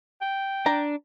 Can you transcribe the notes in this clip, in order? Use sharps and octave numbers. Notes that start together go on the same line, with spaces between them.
G5
D4 A#5